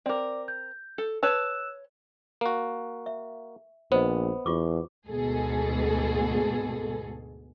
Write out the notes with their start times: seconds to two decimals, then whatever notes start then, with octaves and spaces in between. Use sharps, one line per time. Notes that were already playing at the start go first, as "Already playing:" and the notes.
0.06 C4 A#4 D5 D6
0.48 G6
0.98 A4
1.23 B4 C#5 A5 E6 F#6 E7
2.41 A#3 F#4
3.06 E5
3.92 A#1 B3 C5 D#5
4.46 E2 F4 C#6 D6
5.08 D2 G#2 B2 G#4 A4